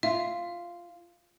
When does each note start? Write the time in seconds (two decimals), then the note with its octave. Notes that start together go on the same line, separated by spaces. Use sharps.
0.03 F4 E5